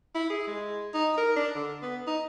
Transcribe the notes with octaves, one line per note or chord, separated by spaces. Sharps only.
E4
G#4
G#3
D#4
A#4
D4
D3
B3
D#4